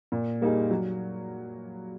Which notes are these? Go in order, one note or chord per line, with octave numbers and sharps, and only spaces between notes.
A#2
G3 A#3 D#4 G#4
F#3